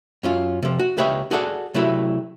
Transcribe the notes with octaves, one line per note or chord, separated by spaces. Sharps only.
F#2 C#4 F4
C3 F3
F#4
C#2 G4 B4 C#5 D#5 E5
F#4 G#4 A4 D5 D#5 F#5
C3 F#3 A3 E4 B4